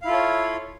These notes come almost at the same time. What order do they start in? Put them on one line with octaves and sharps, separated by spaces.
F5 E4 F4 A4 C#5